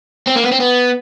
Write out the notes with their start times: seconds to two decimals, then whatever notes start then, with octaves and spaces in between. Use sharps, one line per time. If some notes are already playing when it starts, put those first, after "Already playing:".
0.28 C4
0.36 A#3
0.44 B3
0.52 C4
0.60 B3